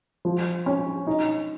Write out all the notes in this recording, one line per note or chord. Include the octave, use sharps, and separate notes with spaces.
F3
C#4
D#4